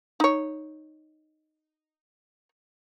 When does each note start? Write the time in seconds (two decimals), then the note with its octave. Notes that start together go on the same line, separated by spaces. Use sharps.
0.20 D#4 C#5